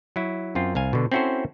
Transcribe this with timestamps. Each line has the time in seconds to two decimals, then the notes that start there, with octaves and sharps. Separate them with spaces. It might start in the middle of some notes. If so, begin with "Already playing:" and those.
0.16 F#3 E4
0.55 F#2 C4 F4
0.75 C2 F5 G#5
0.93 B2 D3
1.12 C4 C#4 E4 F#4 A4 C5